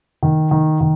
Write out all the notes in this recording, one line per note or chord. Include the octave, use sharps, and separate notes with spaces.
D#3
D#3
D#3